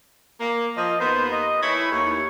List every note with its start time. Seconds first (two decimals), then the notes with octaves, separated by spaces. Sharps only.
0.40 A#3
0.77 F3 D#5
1.00 D#2 A#3 B3 C5
1.32 D#5
1.63 E3 A3 E4 C#5
1.92 D#2 C#5